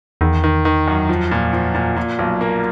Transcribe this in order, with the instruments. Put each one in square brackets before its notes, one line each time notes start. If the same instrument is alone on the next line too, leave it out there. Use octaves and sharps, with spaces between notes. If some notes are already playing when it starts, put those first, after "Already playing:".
[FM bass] E2 [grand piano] D#3
[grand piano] D#3
D#3
F#2
F3
A#2
F3
A#2
A#2
B1
A#3